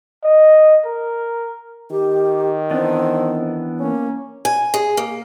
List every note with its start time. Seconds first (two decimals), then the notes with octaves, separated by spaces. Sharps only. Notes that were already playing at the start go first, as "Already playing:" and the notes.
0.24 D#5
0.85 A#4
1.91 D#3 G4
2.71 E3 B3 C4 D4
3.80 A#3 C#4
4.45 G#5
4.74 G#4
4.97 A#3